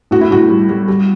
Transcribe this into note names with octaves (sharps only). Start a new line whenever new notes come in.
A2 F#4
E4
A2 F#4
G3
G3
G3